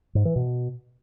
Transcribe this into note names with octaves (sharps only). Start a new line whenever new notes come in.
G#2
E3
B2